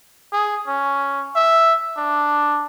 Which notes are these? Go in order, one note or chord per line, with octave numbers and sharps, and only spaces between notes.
G#4
C#4
E5
D4